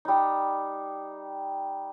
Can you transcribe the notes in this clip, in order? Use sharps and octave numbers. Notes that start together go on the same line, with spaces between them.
G3 D#4